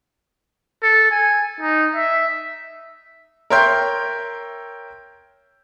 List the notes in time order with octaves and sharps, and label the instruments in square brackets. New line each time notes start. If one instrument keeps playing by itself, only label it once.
[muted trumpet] A4
G#5
D#4
E5
[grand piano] A#4 C#5 E5 G5 C6 G6